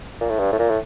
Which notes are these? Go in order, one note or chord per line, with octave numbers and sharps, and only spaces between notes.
A#2
A2
G2
A2
A#2
A2